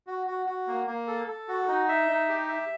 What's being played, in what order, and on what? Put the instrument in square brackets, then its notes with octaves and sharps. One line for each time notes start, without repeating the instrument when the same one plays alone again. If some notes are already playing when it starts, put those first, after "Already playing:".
[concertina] F#4
F#4
F#4
A#3
A#3
A4
A4
F#4
D#4
E5
D#4
G4
E5